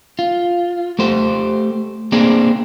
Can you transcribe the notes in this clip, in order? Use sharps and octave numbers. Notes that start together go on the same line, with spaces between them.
F4
A3 G4 C5
A#3 C4 D4 G#4